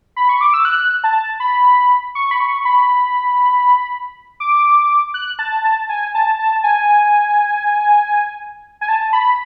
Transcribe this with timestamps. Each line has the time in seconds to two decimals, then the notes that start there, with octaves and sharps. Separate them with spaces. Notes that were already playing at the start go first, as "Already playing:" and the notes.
0.16 B5
0.29 C#6
0.41 D6
0.54 E6
0.65 F#6
1.04 A5
1.40 B5
2.15 C#6
2.31 B5
2.40 C#6
2.65 B5
4.40 D6
5.14 F#6
5.39 A5
5.64 A5
5.89 G#5
6.15 A5
6.39 A5
6.63 G#5
8.81 G#5
8.88 A5
9.13 B5